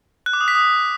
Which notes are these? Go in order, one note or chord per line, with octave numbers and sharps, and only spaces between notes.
F#6
D6
D#6
B6
D#6